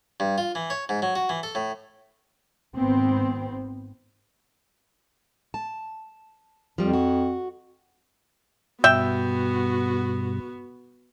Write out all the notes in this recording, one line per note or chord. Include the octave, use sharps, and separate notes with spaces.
G2
F4
E3
C#5
G#2
F#3
F#4
E3
A4
A2
G#1 B3 C4
A5
F2 F3 G3
F#4
G2 B2 B3 F#4 E5 G5